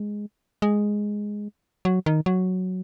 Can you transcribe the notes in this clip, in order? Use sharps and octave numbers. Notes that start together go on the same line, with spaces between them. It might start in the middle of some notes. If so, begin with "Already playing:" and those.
Already playing: G#3
G#3
F#3
D#3
F#3